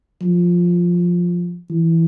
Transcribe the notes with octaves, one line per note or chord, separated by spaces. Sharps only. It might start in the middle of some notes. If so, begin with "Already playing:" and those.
F3
E3